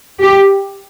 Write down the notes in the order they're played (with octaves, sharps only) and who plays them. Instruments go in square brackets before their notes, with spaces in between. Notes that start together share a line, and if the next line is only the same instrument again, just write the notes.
[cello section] G4